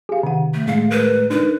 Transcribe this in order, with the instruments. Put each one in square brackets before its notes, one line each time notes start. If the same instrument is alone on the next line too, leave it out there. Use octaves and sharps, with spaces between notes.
[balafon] G4 F5 [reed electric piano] G#4
[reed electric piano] C3 [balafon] D#3 F#5
[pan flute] A3
[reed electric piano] A2 G#3 A3 [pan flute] F5
[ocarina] A#4 [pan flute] B4
[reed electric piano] D4 [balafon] D#4 [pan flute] B4